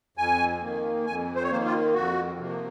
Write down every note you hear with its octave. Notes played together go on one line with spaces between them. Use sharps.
F2 G#5
D#3 A#3
F2 G#5
C5
C#5
D#3 A#3 C5
F4
F2 F#4
C3 F3 A#3